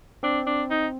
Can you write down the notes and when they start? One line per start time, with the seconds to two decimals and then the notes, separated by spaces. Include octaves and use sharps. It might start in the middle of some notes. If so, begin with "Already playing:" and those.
0.23 C4 D4
0.46 D4
0.70 D#4